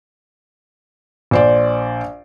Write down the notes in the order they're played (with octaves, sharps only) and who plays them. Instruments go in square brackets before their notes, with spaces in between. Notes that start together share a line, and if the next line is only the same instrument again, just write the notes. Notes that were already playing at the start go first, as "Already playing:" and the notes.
[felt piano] A#1 C5 D5